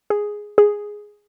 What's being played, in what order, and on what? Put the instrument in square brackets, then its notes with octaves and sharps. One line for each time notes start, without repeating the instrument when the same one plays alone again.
[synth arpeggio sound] G#4
G#4